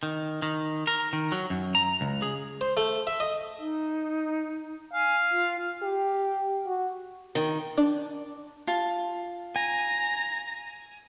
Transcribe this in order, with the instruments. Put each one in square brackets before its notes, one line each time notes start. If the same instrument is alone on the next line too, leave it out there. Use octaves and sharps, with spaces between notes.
[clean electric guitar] D#3
D#3
A#4
D#3
F#3
F#2
A#5
C#2
G#4
[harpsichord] C5
A3
E5
D#5
[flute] D#4
[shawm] F5 [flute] G#5
[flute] F4
[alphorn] G4
F#4
[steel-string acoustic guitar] D#3
[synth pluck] D4
[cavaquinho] F4 A5
[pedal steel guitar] G#5 [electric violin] A#5